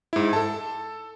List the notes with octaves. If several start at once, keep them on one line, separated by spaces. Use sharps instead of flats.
G#2 E4
A4 A5